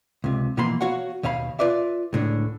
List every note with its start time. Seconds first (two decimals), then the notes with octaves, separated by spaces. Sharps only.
0.24 C#2 C3
0.57 B2 E3 F3 A#3 B5 C6
0.81 B3 F#4 C#5 F5 F#5
1.23 D#2 B2 C#5 F5 B5
1.59 F4 B4 D5 E5
2.13 C#2 A2 D3